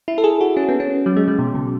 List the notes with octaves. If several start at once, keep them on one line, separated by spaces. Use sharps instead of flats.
E4
A4
G#4
F#4
C#4
B3
C#4
F#3
G#3
F#3
B2
C#3